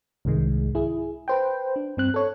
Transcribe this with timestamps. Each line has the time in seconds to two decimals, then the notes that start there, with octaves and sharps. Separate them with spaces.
0.25 C2 G#2 D#3 G#3
0.75 E4 G#4
1.28 B4 C5 G5
1.76 D4
1.97 G2 C4 F#6
2.14 A4 C#5